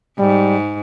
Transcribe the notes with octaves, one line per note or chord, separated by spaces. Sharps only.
G#2 G3